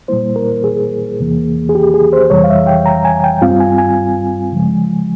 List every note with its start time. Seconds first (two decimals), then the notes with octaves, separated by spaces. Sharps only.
0.08 A#2 G3 A#3 E4 C5
0.36 A#4
0.64 G#4
1.20 E2 C3 E3 A#3
1.69 G#4
1.75 G4
1.94 G#4
2.13 C5
2.30 F2 C3 E3 G3 C#5
2.44 F5
2.50 E5
2.67 G5
2.86 A#5
3.05 G#5
3.24 G5
3.42 G2 G3 C4 F4 F5
3.60 G#5
3.78 G#5
4.52 C#3 F3 G#3